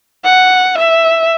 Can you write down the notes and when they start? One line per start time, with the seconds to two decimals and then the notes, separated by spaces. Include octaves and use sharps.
0.24 F#5
0.78 E5